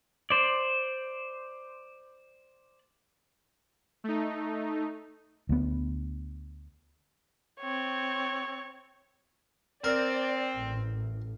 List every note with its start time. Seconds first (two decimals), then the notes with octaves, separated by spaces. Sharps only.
0.30 C5 D5
4.04 A3 D#4
5.49 D2 B3
7.60 C4 C#5
9.84 C4 A#4 D5
10.55 A1